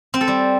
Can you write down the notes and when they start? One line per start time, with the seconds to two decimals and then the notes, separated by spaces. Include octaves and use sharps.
0.14 C4
0.21 A4
0.28 G3